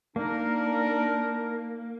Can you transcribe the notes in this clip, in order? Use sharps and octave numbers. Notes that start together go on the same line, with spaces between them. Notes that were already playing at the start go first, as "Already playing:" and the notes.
A#3 D4 D#4 A#4